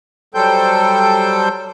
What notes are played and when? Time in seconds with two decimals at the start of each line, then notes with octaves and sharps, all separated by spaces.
0.35 F#3 G3 A4 C5 G5 G6